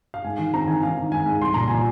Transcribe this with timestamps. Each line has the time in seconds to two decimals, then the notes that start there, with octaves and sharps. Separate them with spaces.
0.14 F5
0.24 G#2 G#5
0.39 D#3
0.54 C4 A#5
0.68 D#3 G#5
0.82 D#3 F5
0.98 D#3
1.12 G#2 G#5
1.26 G#2
1.41 C2 C6
1.54 A#2 A#5
1.68 A#2 G#5